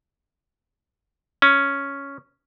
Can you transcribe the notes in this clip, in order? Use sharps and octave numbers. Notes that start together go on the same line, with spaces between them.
C#4